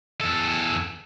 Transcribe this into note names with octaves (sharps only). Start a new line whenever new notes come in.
E2 A4